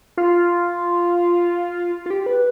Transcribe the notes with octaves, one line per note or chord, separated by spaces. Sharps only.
F4
F4
G4
B4